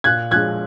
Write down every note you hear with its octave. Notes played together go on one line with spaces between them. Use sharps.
A#2 F#6 G#6
F3 G#3 F#6 G#6